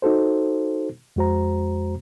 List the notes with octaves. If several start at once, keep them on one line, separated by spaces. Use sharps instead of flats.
D#4 F#4 A4 C5
F2 G#3 F#4 C5 A#5